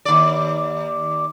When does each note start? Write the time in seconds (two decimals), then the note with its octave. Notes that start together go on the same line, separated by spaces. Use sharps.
0.05 D#2 D5